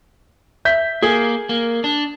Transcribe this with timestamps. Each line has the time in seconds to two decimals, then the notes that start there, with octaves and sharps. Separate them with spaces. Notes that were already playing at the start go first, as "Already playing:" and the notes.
0.65 E5 G6 B6
1.02 A#3 G#4
1.49 A#3
1.84 D4